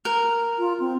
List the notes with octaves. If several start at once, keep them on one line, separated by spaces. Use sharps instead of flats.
A#4
F4
C4